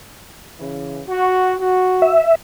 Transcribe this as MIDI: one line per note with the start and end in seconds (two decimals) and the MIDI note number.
0.60 1.01 49
0.60 1.01 52
1.08 1.54 66
1.60 2.18 66
2.02 2.35 76